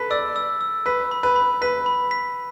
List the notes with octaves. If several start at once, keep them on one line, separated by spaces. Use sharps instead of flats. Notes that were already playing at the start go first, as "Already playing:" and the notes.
Already playing: A4 B4 B6
D5 E6
E6
E6
B4 B6
B5
B4
B5
B4 B6
B5
B6